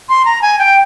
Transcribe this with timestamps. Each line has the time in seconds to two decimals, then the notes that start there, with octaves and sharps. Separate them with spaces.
0.09 C6
0.25 A#5
0.42 G#5
0.59 G5